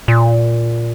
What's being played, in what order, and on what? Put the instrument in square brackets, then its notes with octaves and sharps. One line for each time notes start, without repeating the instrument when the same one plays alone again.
[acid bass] A#2